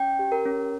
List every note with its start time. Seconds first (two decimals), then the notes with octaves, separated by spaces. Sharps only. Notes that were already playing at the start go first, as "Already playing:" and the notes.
Already playing: C#4 G5
0.19 G4
0.32 A#4
0.46 C#4